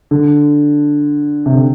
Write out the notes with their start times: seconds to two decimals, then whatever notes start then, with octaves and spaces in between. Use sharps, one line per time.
0.11 D3
1.46 C3
1.54 D3